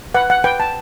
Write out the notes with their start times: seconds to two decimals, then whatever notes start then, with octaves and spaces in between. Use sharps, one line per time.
0.15 B4 F#5
0.30 F#5
0.44 B4 G5
0.60 A5